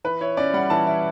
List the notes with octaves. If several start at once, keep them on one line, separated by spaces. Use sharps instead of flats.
E3 B4
E4 C#5
C#4 D5
G3 F#5
E3 A5
E4